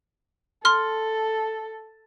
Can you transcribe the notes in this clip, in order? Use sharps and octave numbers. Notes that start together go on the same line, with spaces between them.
A4 C6 F6